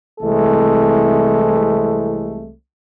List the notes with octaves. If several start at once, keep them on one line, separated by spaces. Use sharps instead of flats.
C2 C3 E3 G#3 A3 A4